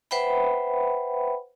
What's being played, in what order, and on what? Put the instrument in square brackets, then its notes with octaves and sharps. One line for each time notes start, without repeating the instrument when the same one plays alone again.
[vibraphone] B4 C5 E5 F#5 G5 B5